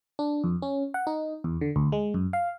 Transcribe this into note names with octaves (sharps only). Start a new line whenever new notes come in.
D4
F2
C#4
F#5
D#4
E2
D3
D2
G#3
F#2
F5